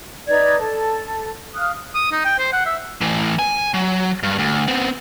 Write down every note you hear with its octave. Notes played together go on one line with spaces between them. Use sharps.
D#4 B4 D5 G#6
A4
F5 D#6 F6 F#6
D#6
D#4
G5
C5
F#5
E5
A2 E3
G#5
F#3
G2
D2
B3 C4